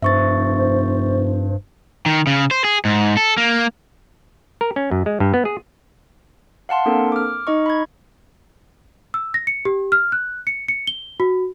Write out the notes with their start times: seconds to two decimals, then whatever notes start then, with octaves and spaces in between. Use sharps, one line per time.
0.02 F1 G2 C5 E5 C#6 A6
2.06 D#3
2.27 C#3
2.51 C5
2.64 G#4
2.85 G#2
3.17 A4
3.38 A#3
4.61 A#4
4.76 C#4
4.91 F#2
5.06 G#3
5.20 G2
5.34 B3
5.45 G#4
6.69 F5 F#5 A5 C6
6.86 A#3 C4 D4 A4 A#4
7.12 D6 F6
7.47 D#4 D#5 C#6
7.66 B5 G#6
9.14 E6
9.34 A#6
9.47 C#7
9.65 G4
9.92 F6
10.12 F#6
10.47 C#7
10.68 C#7
10.87 G7
11.20 F#4